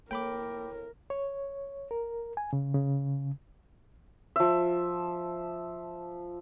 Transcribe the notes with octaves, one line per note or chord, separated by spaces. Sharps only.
A2 A#3 A#4 G5 B5 D6
C#5
A#4
G#5
C#3
C#3
F3 E5